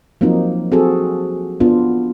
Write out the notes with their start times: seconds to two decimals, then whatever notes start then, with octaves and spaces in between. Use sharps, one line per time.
0.21 F3 F#3 A#3 C4 D#4
0.72 C4 F#4 G#4 A4
1.60 B3 D4 F4